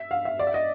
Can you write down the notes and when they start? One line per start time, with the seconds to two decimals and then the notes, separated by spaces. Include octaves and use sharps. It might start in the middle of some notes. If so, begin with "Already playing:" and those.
Already playing: E5
0.11 F5
0.25 E5
0.39 D5
0.47 E5
0.54 D#5